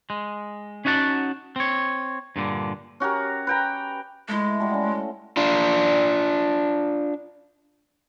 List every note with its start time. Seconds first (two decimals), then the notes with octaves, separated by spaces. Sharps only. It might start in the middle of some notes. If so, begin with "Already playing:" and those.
0.10 G#3
0.85 C#4 D#4 F#4 F#5 A5
1.56 C4 C#5
2.36 G2 A#2 D3
3.00 C#4 F#4 G4 A#4
3.47 B4 G5 A#5
4.29 G#3 A3 E4
4.60 G3 F#4 A4
4.74 C#4
5.37 D4 F4